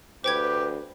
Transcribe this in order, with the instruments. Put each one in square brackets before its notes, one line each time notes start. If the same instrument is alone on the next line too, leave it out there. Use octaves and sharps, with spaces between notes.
[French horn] D2 [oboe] G4 [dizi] B4 [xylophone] C5 G5 G#6